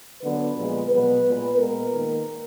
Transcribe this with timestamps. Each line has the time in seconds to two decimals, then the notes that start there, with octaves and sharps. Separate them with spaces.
0.21 D3 F#3 B3 B4
0.56 A#2 F3 G#3 B3
0.89 B2 F#3 B3 B4
1.23 A#2 G#3 B3
1.57 A#2 G#3 B3 A#4
1.92 D#3 A#3